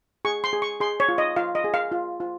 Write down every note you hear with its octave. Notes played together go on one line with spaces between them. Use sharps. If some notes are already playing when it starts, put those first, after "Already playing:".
G#4 C#6
C6
G#4
C#6
G#4 C6
C#5
F4
D#5
F4 F5
D#5
G#4
F5
F4
F4